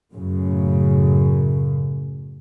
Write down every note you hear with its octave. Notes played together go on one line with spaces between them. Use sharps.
F#2 A2 C#3